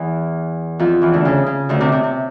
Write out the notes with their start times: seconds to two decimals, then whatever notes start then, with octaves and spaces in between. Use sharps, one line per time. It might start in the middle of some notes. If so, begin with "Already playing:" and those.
Already playing: E2 E3
0.79 F2 F3
1.02 E2 E3
1.13 D2 D3
1.25 C#3
1.46 C#3
1.69 D2 D3
1.81 C3
1.92 C3
2.03 C3